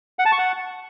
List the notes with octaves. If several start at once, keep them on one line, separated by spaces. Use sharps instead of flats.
F#5
A5
C#6
F#5